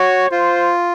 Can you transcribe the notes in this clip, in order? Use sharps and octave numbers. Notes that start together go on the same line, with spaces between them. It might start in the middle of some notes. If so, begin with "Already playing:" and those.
Already playing: F#4 C#5
F4 C5